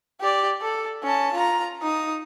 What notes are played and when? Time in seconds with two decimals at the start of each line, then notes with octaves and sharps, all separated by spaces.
0.20 G4 D5
0.62 A4
1.03 C#4 A5
1.33 F4 A#5
1.82 D#4 D#6